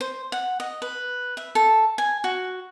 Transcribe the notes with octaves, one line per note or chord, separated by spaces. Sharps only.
C5
F#5
D#5
B4
E5
A4
G#5
F#4